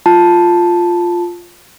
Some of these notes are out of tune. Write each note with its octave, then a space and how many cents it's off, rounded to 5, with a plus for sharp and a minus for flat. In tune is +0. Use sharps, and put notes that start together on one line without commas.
F4 +0 A5 +0